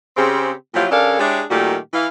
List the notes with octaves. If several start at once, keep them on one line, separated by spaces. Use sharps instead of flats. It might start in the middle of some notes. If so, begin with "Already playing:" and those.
C#3 C4 G4
A#2 F3 F#3 E4 F4 G4
C#3 C#4 D4 A4 A#4 F5
G#3 D4 E4 G4 G#4 C#5
A#2 D#3 G3 A3 F#4 G4
E3 F5